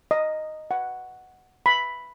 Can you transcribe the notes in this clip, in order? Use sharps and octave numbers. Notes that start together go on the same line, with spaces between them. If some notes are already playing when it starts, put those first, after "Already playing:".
D#5
F#5
B5